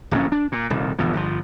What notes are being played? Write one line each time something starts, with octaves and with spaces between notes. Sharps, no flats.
D1 A#1 G2 C#4
D4
A#2
D#1 C2
G1 E2 B2 F3
G1 D3 F3